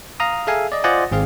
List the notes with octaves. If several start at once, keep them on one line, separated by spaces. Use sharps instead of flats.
F5 A#5 D#6
G#4 A4 E5 F5 G#5
D5 D#5
F4 C5 D5 D#5 F#5 G#5
G#1 C4 G#4 F5